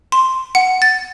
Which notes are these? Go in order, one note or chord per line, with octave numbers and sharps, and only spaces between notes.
C6
F#5 C#7
A6